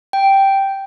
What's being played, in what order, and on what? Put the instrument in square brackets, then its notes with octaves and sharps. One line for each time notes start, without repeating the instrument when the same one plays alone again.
[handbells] G5